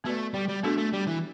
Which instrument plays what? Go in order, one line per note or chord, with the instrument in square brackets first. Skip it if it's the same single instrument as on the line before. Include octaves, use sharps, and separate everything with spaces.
[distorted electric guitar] A3 [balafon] B3 F#4 B4 D5
[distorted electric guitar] G3
G3
[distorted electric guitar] A3 [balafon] B3 D4 F#4 A4
[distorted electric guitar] A3
G3
E3